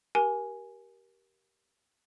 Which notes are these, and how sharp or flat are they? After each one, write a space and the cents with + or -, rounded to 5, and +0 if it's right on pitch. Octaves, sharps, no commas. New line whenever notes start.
G4 -20 A#4 +20 G#5 +0